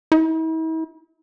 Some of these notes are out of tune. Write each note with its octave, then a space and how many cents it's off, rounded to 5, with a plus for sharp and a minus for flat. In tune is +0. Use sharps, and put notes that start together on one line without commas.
E4 -45